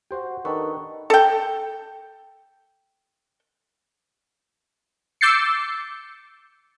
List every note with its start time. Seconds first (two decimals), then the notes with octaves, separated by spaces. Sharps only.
0.11 F#4 G4 C5 F#5 G5
0.45 D#3 D4 A4 B4 C#6
1.10 A4 G5
5.21 D6 E6 G6 A6 C7 C#7